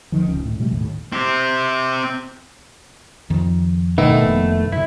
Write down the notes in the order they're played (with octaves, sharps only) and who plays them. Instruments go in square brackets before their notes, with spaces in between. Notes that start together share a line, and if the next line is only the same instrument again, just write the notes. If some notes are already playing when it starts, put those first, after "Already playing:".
[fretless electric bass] D#2 D3 D#3 F3
D1 C#2 C#4
A2
B2 F#3 G3 A3
G#1 D#2 A2
[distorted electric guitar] C4 G4
[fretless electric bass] F2 D#3 F3
[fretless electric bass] G1 B2 [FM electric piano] D#3 B3 E4 [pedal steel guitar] A3
[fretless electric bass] F1 A#2
[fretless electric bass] F#2 C#3 [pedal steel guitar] E4